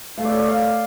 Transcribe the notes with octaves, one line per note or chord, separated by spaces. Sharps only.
A3 F5
D5
C#5
D5
F5